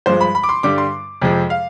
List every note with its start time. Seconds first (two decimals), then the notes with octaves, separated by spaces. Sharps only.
0.06 G2 F3 G#3 C5
0.21 B5
0.35 B5
0.44 D6
0.49 C6
0.63 G2 D3 G3 D6
0.78 C6
1.22 F2 C3 F3 G#3
1.50 F5